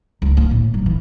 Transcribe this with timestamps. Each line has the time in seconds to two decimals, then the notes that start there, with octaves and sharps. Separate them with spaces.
0.22 C#2
0.37 A#3
0.51 A2
0.74 F#3
0.86 E3